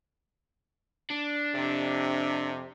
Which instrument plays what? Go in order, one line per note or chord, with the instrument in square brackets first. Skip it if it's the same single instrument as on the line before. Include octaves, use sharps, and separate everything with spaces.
[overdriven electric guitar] D4
[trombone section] F2 C3